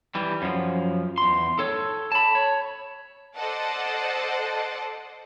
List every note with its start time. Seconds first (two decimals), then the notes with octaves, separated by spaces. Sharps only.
0.15 E3 G3
0.42 F#2 F3
1.18 E2 C6
1.59 A4 C#5
2.12 A5 B5
2.35 C#5
3.36 A4 C5 D5 D#5 F#5 A5